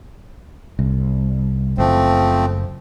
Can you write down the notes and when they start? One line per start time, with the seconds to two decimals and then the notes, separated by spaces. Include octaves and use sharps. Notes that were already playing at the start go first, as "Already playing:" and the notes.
0.79 C2
1.78 F#1 F3 A3 C4